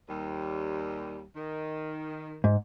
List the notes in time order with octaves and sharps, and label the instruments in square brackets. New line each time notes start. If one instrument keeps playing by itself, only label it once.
[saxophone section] D#2 G3
D#3
[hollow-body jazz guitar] G#2